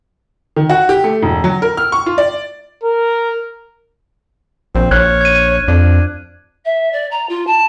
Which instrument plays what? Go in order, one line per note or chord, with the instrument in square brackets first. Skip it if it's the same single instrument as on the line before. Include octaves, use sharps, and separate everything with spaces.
[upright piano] D#3
F#4
G4
A3
E1
F#3
A#4
F6
C#6
F4
D5
[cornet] A#4
[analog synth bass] A#1 [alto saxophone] C4
[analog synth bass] A#1 [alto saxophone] C#5 [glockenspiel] F6 F#6 G#6
[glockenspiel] G#6 D#7
[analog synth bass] F2 [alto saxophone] D4
[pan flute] E5
D5
A#5
F4
A5